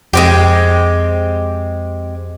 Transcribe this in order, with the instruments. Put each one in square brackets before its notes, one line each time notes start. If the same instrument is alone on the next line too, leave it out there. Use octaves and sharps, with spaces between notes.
[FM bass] F2 [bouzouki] G#3 C4 G4